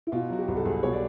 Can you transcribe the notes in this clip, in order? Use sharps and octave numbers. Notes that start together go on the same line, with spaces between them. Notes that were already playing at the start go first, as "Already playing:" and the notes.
E4
B2 F4
F#3 F#4
G4
C2
A4
C2 G#4
B2 C#5
D5